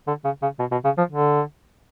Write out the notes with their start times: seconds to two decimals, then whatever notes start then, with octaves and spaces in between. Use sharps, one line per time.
0.07 D3
0.25 C#3
0.42 C#3
0.59 B2
0.72 B2
0.85 C#3
0.98 F3
1.10 D3